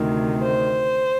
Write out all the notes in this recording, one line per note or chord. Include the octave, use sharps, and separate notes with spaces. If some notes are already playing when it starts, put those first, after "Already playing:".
Already playing: D2 C3 D#3
C5